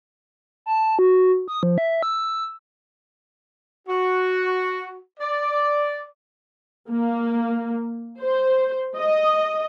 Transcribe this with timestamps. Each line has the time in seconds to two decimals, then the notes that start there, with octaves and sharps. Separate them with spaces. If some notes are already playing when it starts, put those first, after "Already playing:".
0.66 A5
0.99 F#4
1.48 D#6
1.63 F3
1.78 E5
2.03 E6
3.88 F#4
5.20 D5
6.90 A#3
8.21 C5
8.98 D#5